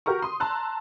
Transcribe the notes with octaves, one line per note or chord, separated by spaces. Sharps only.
F#4 G4 A#4 A#5 C#6
C6 D#6
A5 A#5 C6 E6 F#6